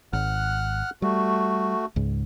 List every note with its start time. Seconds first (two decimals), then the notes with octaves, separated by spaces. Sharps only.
0.13 G#1 F#5 F6 F#6
1.02 G3 A3 F#4
1.96 C#2 G#2